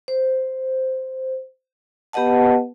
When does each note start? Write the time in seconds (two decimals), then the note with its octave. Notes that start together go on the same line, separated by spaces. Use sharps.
0.08 C5
2.13 B3 G4 B4 D#5 F#5 A5